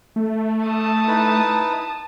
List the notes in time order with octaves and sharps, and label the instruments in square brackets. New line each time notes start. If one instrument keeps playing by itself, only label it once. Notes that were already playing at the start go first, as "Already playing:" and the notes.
[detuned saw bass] A3
[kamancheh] A5 D#6
[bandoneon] D#4 E4 B4